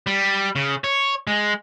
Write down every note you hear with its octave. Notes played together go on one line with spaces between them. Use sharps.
G3
C#3
C#5
G#3